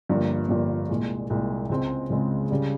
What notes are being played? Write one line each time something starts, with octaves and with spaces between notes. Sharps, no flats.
G1 G2 F3 A#3
G1 G2 F3 A#3
C2 A#2 G#3
C2 A#2 G#3
C#2 C#3 G#3 C4
C#2 C#3 G#3 C4
C#3 G3